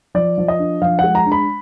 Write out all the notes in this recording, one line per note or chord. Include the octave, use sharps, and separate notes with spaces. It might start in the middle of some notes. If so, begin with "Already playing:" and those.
F3 D5
F3
D#5
D4
F3 F5
G#3 F#5
A#5
D4
B5